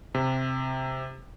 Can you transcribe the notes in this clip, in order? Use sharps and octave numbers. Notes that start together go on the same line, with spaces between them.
C3